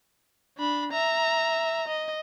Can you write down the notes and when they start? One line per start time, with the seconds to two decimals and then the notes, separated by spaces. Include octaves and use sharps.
0.58 D4 B5
0.92 E5 A#5
1.88 D#5